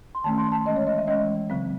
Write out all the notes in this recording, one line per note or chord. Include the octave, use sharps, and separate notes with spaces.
C6
D#3 A3 C#4 A5
C6
A5
E3 G#3 C#4 D#5
C#5
D#5
E5
E3 G#3 C#4 D#5
C#3 F#3 C4